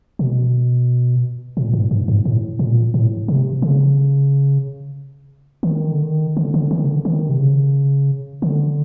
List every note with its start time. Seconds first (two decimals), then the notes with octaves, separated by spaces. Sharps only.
0.19 B2
1.57 A#2
1.74 G#2
1.91 G2
2.08 G#2
2.25 A2
2.59 A#2
2.94 A2
3.28 C3
3.62 C#3
5.63 D3
5.68 D#3
5.92 D3
6.03 D#3
6.37 D3
6.54 D3
6.71 D#3
6.84 C#3
6.88 D3
7.05 D#3
7.29 C3
7.39 C#3
8.42 D3